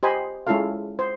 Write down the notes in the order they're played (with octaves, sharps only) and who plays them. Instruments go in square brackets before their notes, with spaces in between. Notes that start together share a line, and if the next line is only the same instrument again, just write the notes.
[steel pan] G4 C5 D#5 G#5 B5
G#3 C#4 E4 F4 A4 F5
C5